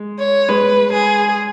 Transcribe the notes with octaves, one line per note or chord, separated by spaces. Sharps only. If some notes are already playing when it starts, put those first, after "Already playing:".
Already playing: G#3
C#5
G#3 B4
G#4